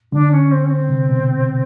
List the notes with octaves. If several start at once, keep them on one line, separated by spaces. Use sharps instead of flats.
D3 D4
C#4
C4
C#4
C4
C3
B2